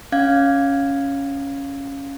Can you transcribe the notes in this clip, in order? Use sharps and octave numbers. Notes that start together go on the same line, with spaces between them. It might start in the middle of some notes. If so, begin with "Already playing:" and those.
C#4 F5 G#6